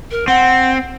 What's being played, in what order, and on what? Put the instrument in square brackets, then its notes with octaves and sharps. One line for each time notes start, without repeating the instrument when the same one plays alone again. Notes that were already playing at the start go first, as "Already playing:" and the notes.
[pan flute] A#4
[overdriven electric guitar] C4 [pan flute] F#5